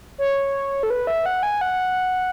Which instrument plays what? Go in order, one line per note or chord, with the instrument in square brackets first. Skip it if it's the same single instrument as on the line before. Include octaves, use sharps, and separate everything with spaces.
[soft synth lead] C#5
A4
B4
E5
F#5
G#5
F#5